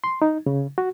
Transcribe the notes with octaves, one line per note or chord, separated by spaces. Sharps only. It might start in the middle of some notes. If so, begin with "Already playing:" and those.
C6
D#4
C#3
F#4